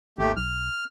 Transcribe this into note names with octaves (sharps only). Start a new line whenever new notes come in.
G#1 D#2 A3 G4
B1 F6